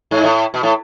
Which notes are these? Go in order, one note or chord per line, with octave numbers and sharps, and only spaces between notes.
G#2
A2
B2
A2